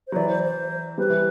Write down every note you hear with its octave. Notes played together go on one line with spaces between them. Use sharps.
C5
F#3
E3 D5
C5
C5
G3 B4
E3